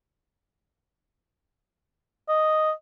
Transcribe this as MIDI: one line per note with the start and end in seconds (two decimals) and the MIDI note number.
2.29 2.71 75